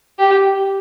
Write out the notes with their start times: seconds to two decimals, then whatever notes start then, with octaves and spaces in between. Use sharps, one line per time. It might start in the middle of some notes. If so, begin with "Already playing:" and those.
0.19 G4